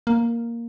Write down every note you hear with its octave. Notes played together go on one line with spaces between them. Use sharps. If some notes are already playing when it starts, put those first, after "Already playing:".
A#3